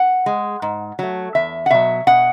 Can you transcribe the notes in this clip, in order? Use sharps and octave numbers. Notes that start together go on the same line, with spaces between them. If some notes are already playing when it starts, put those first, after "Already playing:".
Already playing: F#5
G#3
G#2
F#3 A3
E2 E5
F#5
B2 F#3 E5
B2 F#5